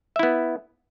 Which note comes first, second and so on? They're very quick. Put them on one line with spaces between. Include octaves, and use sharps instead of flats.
E5 E4 B3